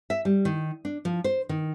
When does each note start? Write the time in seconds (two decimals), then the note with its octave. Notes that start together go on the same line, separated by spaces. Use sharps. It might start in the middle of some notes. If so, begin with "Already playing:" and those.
0.10 E5
0.25 G3
0.45 D#3
0.85 D4
1.05 F3
1.24 C5
1.49 D#3